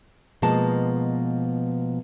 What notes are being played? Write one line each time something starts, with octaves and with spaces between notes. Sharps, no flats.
B2 F3 G#3 A#3 A5